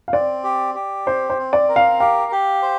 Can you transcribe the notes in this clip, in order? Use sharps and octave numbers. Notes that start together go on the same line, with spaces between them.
F5
C4 D5
G4
G4
C4 C5
C5
C4
D5
A#4
F5
G4 F5
G4
C5